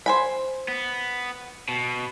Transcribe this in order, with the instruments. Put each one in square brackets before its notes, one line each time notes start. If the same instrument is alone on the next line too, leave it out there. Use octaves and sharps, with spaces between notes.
[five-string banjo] C5 G#5 B5
[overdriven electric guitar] B3
B2